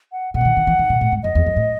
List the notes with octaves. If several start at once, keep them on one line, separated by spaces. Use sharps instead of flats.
F#5
B2 F#5
E3
D#3
D#3
E3
D#3
B2
A2
G#2
F#2 D#5
E2
F#2
A2